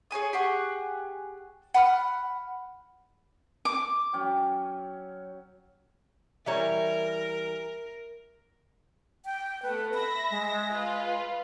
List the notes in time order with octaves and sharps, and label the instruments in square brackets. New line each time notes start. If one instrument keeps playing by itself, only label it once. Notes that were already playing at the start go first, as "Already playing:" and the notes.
[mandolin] G#4 C#5 G#5 D#6
G4 G#4 F#5 C#6
F#5 B5 D6 F6
[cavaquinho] D6
[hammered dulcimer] F#3 C#4 G5
[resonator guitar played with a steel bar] E3 G3 C#5 [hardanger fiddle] A#4 [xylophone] E5 A#5
[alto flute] G5
[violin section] A3 B3 [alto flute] B4
[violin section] E5 A#6 [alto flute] B5
[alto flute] G#3
[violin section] F4 B4